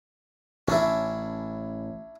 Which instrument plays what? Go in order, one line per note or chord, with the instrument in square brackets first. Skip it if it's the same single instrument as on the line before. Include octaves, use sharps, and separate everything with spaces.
[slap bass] A1 [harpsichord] C#4 D4 E4